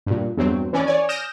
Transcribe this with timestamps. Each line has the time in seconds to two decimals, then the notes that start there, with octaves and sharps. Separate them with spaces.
0.06 G2 A#2
0.37 E2 G2 F#3 C4
0.73 E3 C#4 D5
0.86 C#5 D5 G#5
1.09 D#6 F6 G6 A#6 D7 E7